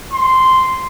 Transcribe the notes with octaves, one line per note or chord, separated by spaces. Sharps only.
C6